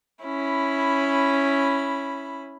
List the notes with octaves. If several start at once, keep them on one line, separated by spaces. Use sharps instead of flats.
C#4 E4 B5